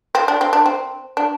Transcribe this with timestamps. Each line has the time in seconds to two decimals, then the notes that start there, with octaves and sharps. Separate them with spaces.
0.15 C4
0.28 D4
0.41 C4
0.53 D4
0.66 C4
1.17 D4